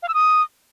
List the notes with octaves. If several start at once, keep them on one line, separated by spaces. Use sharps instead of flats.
F5
E6
D#6